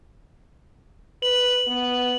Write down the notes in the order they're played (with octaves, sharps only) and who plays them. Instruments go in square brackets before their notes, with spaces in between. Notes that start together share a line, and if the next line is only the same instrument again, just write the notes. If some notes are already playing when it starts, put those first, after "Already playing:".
[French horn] B4 [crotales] F#7
[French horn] B3